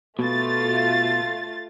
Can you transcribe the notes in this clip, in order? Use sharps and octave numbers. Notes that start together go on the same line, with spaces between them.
B2 A3 F4 A6